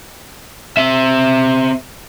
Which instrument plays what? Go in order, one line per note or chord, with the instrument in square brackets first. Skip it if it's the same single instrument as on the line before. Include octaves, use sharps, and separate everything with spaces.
[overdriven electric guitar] C4 E5